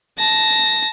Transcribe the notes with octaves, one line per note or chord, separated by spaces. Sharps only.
A5 A#6